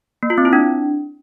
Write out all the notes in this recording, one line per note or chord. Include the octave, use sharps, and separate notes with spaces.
A#3
F4
C4
E4
D4